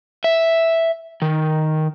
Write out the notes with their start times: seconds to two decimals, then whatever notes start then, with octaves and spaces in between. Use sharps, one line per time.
0.24 E5
1.22 D#3